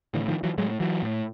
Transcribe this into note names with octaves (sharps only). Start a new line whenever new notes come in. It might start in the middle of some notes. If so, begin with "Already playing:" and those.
A2 D3 E3
D#3 F3
E3 F#3
A2 F#3 G#3
E3 F#3
A2